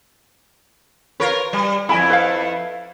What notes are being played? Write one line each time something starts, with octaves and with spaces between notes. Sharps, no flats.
F4 A#4 B4 C#5
G3
F2 E4 D#5 G#5 B5
B4 E5 F5